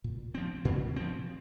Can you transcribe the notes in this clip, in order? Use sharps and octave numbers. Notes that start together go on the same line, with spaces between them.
A#2
F3 C4
A#2
F3 C4